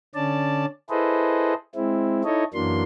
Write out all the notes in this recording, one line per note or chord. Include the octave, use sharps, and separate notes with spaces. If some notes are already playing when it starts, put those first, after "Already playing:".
D3 C#4 D5 A5
E4 G#4 A4 B4 C5 D#5
G#3 C4 E4
D#4 E4 A4 C#5 D#5
F#2 E3 F#3 A#3 D4 C6